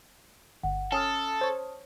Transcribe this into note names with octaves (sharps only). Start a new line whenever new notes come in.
G1 F#5
C#4 A4 A5 D#6 F6
C5 C#5